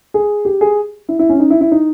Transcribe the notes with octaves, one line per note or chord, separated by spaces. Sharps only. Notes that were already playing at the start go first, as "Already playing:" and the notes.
G#4
G4
G#4
E4
E4
C#4
D#4
E4
E4
D#4